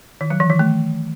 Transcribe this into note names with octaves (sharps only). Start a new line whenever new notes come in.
D#3
F#3
E3
D#3
A3